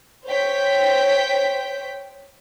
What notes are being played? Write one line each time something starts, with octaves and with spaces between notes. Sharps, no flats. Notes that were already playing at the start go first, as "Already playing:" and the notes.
C5 C#5 G5 B6